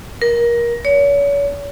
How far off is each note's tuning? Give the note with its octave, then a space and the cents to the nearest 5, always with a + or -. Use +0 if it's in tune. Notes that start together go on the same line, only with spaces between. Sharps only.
A#4 +20
C#5 +40